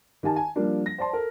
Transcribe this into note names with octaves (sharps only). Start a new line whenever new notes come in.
D#3 G4 G#5 A5
G#5
F3 G3 A#3 D4
A#6
C5 D5 A5 C6
A4 A#4